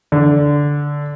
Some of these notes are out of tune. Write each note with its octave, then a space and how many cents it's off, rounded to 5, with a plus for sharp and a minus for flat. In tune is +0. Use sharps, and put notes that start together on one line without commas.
D3 -10